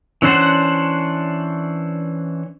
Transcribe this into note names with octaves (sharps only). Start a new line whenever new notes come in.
E3 C#4 D4 C5 F#5